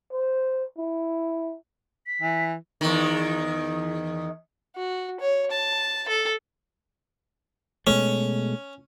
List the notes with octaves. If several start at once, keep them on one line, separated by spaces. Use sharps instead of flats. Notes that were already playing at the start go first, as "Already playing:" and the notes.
C5
E4
B6
E3
E2 D#3
F#4
C#5
A5
A4
B2 G#3 A3 C#4